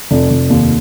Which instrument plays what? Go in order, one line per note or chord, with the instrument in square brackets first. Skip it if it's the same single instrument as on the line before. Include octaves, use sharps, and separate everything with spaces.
[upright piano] F1
F1
D#2